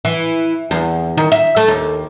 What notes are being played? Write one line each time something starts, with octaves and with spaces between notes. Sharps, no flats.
E3
E2
D#3
E5
A3
D#2